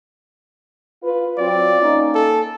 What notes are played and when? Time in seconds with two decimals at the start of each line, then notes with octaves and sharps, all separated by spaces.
1.03 F4 B4
1.38 F#3 C4 F4 D5
1.81 A#3 C#4 D#4
2.15 A4